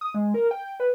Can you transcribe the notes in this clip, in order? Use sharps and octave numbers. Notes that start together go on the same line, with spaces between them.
D#6
G#3
A#4
G5
B4